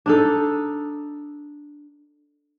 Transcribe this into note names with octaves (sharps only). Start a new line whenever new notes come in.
D4 D#4 A4